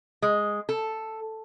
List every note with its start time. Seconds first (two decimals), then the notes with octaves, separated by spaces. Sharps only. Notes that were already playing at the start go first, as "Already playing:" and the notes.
0.22 G#3
0.69 A4